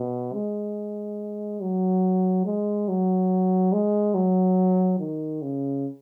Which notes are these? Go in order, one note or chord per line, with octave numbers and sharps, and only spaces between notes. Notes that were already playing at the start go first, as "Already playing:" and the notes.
Already playing: B2
G#3
F#3
G#3
F#3
G#3
F#3
D#3
C#3